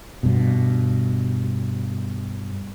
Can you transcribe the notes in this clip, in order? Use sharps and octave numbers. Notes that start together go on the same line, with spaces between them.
G2 B2